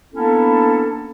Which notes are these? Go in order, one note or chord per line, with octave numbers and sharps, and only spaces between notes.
A#3 B3 C#4 D4 E4 A4